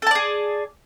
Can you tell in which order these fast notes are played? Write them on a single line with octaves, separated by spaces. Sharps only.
A4 A5 D5 G#4